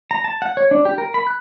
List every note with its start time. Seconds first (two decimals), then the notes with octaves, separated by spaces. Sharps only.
0.11 A#5
0.24 A5
0.42 F#5
0.57 C#5
0.71 D4
0.85 G4
0.98 A#4
1.14 B5
1.27 F#6